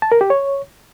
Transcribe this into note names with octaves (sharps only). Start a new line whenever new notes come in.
A5
A#4
G4
C#5